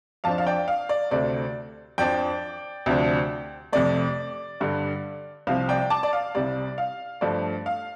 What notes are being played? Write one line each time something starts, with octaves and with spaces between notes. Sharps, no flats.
F2 F3 D4 F5 A5
F5
D5 G5
F5
D5
D2 C3 A3 C4 D5
F2 F3 D4 D5 G5
D2 C3 F3 D4
F2 C3 A3 D5
G2 D3 G3
C2 C3 F3 F5
D5 G5
A5 D6
D5
F5
C2 C3 G3 D5
F5
G2 F3 A3 D4 D5
F5